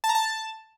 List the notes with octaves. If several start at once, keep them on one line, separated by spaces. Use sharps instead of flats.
A5
A#5
A5